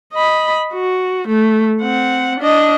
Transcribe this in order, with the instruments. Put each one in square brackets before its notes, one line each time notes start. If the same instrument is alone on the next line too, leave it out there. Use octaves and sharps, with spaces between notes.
[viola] D#5 B5
F#4
A3
C4 F#5
D4 D#5